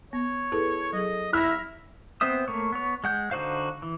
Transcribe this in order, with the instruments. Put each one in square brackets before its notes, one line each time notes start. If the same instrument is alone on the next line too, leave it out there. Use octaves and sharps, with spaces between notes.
[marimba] B3 [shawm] C#5
[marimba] E4 G#4 B4 [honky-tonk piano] A4
[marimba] F#3 G#4 [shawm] D#5
[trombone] E4 [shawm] E5 [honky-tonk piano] F6 A#6
[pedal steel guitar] B3 C4 C5 E5 D#6
A3 A#3 C#5
B3 C#5
G#3 F#5 G6
D3 D#4 F#4 C5 F5
E3